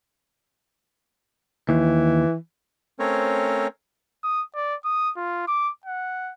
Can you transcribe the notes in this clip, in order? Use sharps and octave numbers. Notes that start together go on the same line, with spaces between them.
D#2 E3
A3 C4 C#4 A#4 C5 C#5
D#6
D5
D#6
F4
D6
F#5